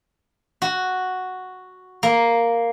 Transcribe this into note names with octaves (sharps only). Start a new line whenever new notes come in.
F#4
A#3